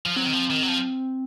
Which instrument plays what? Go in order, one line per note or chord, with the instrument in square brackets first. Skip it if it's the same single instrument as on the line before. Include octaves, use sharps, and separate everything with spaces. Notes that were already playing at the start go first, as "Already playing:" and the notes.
[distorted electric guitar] F3
[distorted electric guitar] F#3 [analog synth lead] C4
[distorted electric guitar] D#3
F3
D#3
F#3
F3